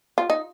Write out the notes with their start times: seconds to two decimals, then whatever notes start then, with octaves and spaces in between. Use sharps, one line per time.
0.18 F4
0.30 D#4